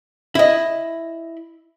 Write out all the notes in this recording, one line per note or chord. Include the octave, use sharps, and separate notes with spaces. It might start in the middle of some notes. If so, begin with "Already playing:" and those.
E4 D#5